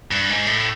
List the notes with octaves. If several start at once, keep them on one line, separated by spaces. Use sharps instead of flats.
G2
G#2
A2